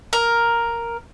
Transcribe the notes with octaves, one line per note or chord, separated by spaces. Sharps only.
A#4